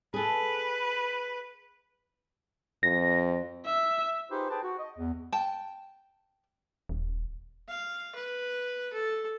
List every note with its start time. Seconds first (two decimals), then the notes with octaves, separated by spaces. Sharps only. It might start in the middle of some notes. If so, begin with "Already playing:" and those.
0.14 G#4 A4 B4
2.83 F2 A#6
3.66 E5
4.30 D#4 F4 G4 G#4 B4 C5
4.50 G#4 B4 C5 G5 A5
4.63 F#4
4.79 D#5
4.97 E2
5.32 G5 A5
6.89 D#1
7.68 F5
8.15 B4
8.93 A4